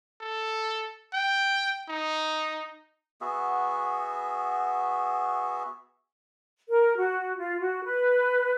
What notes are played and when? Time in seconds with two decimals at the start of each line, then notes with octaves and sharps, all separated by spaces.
0.21 A4
1.14 G5
1.89 D#4
3.21 B3 F#4 G#4 E5
6.68 A#4
6.96 F#4
7.38 F4
7.60 F#4
7.83 B4